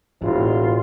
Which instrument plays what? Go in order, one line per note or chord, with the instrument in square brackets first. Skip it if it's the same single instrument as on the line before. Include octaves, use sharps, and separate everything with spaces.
[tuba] E1 [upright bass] A1 [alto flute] F4